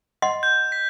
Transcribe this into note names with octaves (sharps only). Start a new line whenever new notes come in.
D#5 F#5 C6
G6
B6